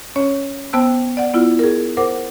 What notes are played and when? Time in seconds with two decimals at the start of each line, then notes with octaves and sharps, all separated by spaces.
0.16 C#4 C#5
0.73 B3 C5 G5 A5 E6 F#6
1.17 D5 F#5
1.34 B3 E4 F4
1.59 G#4 A#4
1.97 A#4 C5 F#5 D6